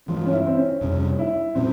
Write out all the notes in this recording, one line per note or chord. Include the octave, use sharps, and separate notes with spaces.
G2 E3 G#3 F4
C#4
E4
C4
C#4
F2 C3 G3 C#4
E4
A#2 G3 C4 C#4